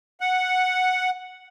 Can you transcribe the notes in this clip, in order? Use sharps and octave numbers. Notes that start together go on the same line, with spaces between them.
F#5